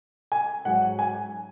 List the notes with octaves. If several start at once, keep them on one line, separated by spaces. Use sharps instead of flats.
G#5
G#2 F#3 F#5
G#5